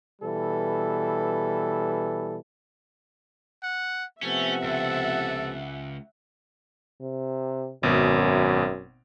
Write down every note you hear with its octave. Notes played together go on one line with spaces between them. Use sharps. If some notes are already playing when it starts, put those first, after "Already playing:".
B2 E3 G3 A4
F#5
C3 F3 A3 B3 C#4 E5 F#5
C#2 A4
C3
G#1 F#2 B2